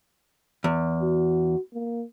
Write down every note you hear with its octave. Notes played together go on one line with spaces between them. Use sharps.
E2
F#4
A#3